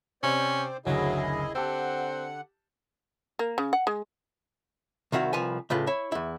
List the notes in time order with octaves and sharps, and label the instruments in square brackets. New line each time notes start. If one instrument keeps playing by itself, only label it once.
[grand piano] C3 [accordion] C4 C5 D5 [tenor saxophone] C#4
[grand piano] F#1 D2 [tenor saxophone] F#3 [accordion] E4 G#4 D#5
[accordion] D3 F#5 [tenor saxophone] C4 [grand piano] G4 A5 E6
[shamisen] A#3
C#3
F#5
G#3
[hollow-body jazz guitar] C2 D#3 E4 F#4 F5
C2 F3 B4 G#5
A2 C#3 F4 B4
E4 C#5
E2 E4